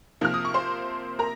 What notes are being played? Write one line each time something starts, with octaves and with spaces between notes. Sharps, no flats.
C3 F3 A#3 F6
D#6
C#6
C5 C6
A#4 A#5